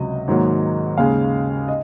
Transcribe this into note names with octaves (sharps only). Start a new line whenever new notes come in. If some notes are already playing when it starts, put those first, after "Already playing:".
Already playing: C#2 C3 F#3 D#5
G#2 D#3 F#3 A#3
D#2 C#3 G#3 F5
D#5